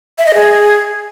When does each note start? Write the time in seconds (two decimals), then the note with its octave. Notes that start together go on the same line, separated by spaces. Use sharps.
0.18 E5
0.26 D#5
0.34 G#4